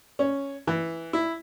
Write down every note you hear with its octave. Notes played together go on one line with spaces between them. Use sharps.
C#4
E3
E4